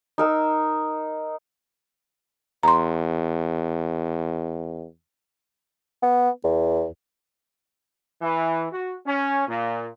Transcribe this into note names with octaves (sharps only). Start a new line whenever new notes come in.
D#4 A#4 E6
E2 A#5 C6
B3
E2
E3
F#4
C#4
A#2